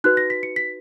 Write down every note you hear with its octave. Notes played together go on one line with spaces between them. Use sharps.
D#4 F#4 B4 F#6
A#6
B6
C#7
B6